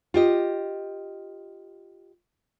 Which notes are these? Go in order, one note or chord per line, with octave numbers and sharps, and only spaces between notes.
F4 G4 D#5